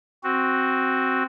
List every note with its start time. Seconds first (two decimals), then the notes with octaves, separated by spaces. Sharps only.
0.23 C4 F#4